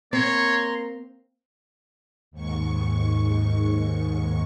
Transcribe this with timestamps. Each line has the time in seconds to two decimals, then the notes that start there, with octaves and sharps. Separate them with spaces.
0.13 A#3 C4 C#5 A#5 C6
2.31 D#2 G#2 C#6